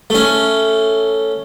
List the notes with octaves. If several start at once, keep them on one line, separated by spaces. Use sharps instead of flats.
A3 C#4